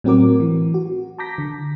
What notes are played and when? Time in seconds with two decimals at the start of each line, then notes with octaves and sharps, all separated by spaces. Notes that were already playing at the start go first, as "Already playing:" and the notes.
0.04 A2 F#3 C4 F#4 A#4 D6
0.40 E3
0.74 F#4
1.18 A5 A#5 D6 G6 A#6 B6
1.38 D3